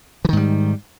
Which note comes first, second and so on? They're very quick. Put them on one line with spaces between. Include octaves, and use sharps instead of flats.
E3 D#3 G#2 G3